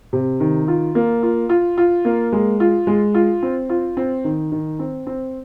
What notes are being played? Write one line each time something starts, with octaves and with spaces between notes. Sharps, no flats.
C3
D#3
F4
A#3
F4
F4
F4
A#3
G#3
F4
G#3
F4
C4
F4
C4
D#3
D#3
C4
C4